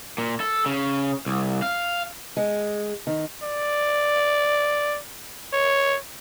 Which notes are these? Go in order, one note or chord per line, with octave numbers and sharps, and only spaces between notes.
A#2
A4
C#3
C2
F5
G#3
D#3
D5
C#5